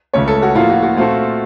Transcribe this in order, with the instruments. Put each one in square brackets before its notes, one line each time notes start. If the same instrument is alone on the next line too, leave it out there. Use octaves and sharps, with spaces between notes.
[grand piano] C#2 C#3 A3 C#4 [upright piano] C#5
[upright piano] A4
F#4
[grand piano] A2 F3 A#3 [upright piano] F4
[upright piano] F#4
F#4
[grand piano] A#2 A3 C4 F#4 A4 [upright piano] F4